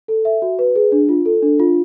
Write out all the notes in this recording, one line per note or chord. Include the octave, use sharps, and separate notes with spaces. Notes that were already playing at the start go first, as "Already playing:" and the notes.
A4
E5
F#4
B4
G#4
D4
F4
A4
D4
F4